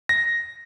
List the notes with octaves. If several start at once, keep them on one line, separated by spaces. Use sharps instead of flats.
A#6